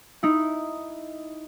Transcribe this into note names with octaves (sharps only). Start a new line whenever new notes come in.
D#4 E4